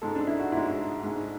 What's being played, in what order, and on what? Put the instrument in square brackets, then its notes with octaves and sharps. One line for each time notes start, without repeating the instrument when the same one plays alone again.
[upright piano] G#2 G#3 A4
D4
E4
F#4
G#2 E4
G#3
G#2 G#3